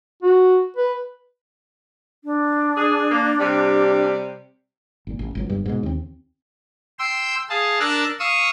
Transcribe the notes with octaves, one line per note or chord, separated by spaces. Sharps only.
F#4
B4
D4
G#4
A#3
C3 G3
G#1 A#2
A1
G#1 C#2 F#3
G1 G2
G#2 B2
D#2 C4
G5 C6 E6
G#4 F5 A5
D4 A#4 E6 F#6 A6
F5 C#6 D#6 E6